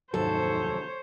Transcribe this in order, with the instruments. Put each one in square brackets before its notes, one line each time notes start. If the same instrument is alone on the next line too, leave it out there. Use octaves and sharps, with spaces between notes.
[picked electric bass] F1 D#2 F#3 [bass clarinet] G#2 [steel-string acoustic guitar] A4 [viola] C5 C#5